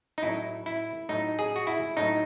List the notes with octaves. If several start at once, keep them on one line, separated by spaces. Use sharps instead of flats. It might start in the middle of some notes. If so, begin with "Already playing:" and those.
D#4
A2 F#3 A3 E4
E4
A2 F#3 A3 D#4
G#4
F#4
E4
A2 F#3 A3 D#4